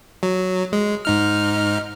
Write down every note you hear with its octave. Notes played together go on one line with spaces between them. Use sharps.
F#3
G#3
G#2 D#4 F6